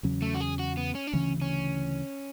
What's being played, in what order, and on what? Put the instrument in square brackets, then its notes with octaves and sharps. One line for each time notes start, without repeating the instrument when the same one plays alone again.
[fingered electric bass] E2 C#3 F#3 C#4
[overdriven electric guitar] A3
F#4
G#4
F#4
B3
C#4
D4
[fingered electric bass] D2 C#3 E3 [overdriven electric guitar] C#4
[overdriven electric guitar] C#4